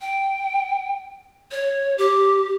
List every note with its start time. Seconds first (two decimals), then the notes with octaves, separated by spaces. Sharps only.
0.01 G5
1.52 C#5
1.98 G4